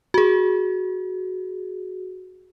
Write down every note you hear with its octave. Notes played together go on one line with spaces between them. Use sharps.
F#4 G#4